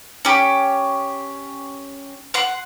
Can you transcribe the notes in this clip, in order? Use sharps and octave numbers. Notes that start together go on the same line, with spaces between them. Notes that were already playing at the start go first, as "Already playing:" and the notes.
C#4 G4
F#5 C6